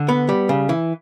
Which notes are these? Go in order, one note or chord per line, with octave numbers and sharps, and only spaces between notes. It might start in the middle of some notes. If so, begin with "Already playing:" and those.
Already playing: D3
B3
G3
C#3
E3